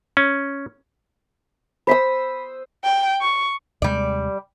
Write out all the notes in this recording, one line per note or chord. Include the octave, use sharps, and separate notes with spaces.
C#4
C5 B5 D#6 E6 B6
G5
C#6
D#2 C3 G3 G#3 D5